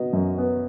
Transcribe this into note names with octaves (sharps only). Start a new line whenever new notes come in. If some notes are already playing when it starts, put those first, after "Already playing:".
Already playing: F#3 B3 D#5
F#2
B3